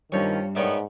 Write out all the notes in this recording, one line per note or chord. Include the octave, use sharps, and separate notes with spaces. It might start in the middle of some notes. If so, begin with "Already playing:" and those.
G2 D#3 F3 G3 A#3 C#4 C#5
G#2 D#3 B3 C#5 D5 E5